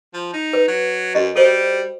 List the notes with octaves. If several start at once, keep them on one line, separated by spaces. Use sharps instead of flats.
F3
D#4
B4
F#3
F#2 F#4 D#5
G3 A4 C5